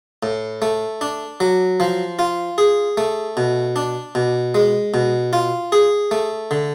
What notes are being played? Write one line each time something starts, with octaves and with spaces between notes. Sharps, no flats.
A2
A3
D4
F#3
F3
F4
G#4
A3
B2
D4
B2
G#3
B2
F4
G#4
A3
D3